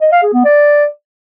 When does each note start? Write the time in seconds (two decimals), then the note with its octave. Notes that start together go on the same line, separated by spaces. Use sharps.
0.01 D#5
0.12 F5
0.23 G#4
0.34 B3
0.44 D5